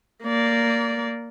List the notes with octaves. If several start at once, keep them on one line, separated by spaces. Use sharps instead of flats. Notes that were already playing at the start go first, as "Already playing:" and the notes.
A#3 D5